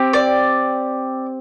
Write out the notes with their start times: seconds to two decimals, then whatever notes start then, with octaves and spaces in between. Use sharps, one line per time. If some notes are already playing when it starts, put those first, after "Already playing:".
Already playing: C4 G4
0.13 D5